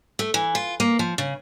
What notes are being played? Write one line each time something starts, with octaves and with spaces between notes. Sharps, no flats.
A3
E3
F4
A#3
F3
C#3